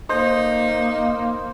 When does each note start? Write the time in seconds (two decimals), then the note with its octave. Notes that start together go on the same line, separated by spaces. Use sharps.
0.09 A#3 D#4 C5